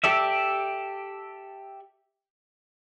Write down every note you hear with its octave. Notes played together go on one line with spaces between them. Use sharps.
G4 A4 D5 E5